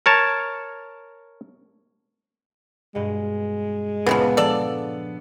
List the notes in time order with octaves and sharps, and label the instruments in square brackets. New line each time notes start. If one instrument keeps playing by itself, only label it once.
[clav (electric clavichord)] A#4 C#5 A5
[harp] G2 B2 [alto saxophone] G#3
[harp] C#2 A#2 [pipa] C#3 E3 F3 [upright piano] B3
[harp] F3 D4 [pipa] A4 D5